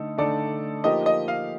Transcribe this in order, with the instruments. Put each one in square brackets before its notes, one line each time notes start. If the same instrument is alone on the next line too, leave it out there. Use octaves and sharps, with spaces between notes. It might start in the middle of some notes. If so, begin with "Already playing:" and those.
Already playing: [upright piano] D3 A3 D#4 A4
[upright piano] D3 A3 D#4 A4 [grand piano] D5
[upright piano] F3 A#3 D#4 G4 A#4 [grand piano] D#5
[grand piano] D#5
F5